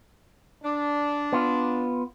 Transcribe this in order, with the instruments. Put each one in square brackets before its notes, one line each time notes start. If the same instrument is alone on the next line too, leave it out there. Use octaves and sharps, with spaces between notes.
[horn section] D4
[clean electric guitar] B3 F4